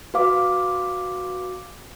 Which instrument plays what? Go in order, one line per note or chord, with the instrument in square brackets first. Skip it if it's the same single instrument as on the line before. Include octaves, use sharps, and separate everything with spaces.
[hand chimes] F#4 B4 F5 D6